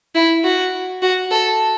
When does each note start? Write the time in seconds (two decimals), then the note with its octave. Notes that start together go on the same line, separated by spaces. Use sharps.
0.15 E4
0.44 F#4
1.02 F#4
1.31 A4